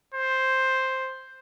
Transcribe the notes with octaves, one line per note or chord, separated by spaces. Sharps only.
C5